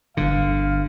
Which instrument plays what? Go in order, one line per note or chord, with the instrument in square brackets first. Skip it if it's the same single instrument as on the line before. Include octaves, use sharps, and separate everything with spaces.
[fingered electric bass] G1 G2 [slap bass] D3 [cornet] F5